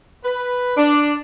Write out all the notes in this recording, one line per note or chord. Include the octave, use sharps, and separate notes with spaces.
B4
D4